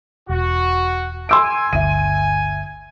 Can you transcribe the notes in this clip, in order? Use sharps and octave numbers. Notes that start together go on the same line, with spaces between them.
E1 F#4
G#5 C6 E6 D7
G1 D2 E5 D#7